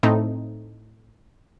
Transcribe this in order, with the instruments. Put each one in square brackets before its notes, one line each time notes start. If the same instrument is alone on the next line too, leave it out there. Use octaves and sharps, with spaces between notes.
[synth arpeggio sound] A2 A3 C4 D#4